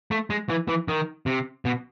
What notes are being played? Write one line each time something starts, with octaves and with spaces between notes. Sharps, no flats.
A3
G#3
E3
E3
D#3
C3
B2